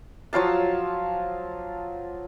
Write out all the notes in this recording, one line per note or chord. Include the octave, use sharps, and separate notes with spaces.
F3 F#3 F5 A5